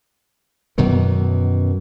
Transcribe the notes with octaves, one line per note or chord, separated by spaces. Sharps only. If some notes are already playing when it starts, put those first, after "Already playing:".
F#2 B2 D#3 E3